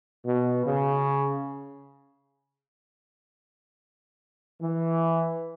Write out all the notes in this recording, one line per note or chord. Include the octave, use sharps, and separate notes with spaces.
B2
C#3
E3